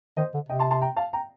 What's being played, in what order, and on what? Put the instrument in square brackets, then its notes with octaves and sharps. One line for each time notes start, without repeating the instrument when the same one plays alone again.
[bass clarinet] D#3 [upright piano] C5 D#5
[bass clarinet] D3
[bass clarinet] C3 [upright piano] D#5 G5
[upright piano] A5 C6
A5 C6
G5 A#5
F5 A5
G5 A#5